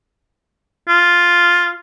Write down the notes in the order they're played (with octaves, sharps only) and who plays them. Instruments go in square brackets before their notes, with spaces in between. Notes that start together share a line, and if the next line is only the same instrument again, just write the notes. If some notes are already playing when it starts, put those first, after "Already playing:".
[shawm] F4